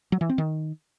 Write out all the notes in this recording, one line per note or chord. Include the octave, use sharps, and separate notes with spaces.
F#3
E3
C4
D#3